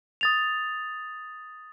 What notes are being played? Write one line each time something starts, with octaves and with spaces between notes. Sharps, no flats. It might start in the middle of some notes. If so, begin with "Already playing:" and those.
D#6 A6 F7